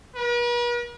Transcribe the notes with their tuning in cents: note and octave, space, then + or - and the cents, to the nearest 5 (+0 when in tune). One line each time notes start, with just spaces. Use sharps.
B4 -45